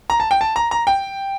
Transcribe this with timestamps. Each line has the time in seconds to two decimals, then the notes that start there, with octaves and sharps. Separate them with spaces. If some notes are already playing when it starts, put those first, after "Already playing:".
0.10 A#5
0.20 A5
0.31 G5
0.41 A5
0.56 A#5
0.71 A#5
0.87 G5